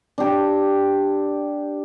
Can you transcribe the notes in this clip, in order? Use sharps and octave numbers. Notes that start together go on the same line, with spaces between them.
D4 G4